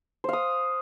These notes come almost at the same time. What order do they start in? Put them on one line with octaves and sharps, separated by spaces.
C5 F5 D#6